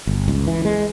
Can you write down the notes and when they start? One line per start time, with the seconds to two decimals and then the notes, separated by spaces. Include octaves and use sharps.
0.07 G1
0.28 C#2
0.47 E3
0.65 G#3